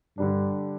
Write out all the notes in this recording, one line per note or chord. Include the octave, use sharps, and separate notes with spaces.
G2 D3 G3 D4